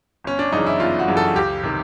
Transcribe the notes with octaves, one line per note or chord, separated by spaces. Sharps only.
G1 C#4
D4
F#2 C#3 E3 D#4
E4
G1 F4
F#4
F#2 C#3 E3
A4
C#2 G4
C3 D#3